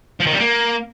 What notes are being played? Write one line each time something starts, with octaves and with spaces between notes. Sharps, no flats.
F3
D#3
G3
A#3